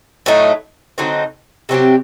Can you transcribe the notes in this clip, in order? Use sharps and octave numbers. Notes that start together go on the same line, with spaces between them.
A2 F#3 A3 D#4
D3 F#3 C4 D#4
C3 F#3 C4 G4